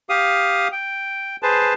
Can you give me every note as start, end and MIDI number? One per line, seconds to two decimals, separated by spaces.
0.09 0.68 67
0.09 0.68 77
0.09 0.68 87
0.72 1.36 79
1.43 1.74 68
1.43 1.74 71
1.43 1.74 72
1.43 1.74 81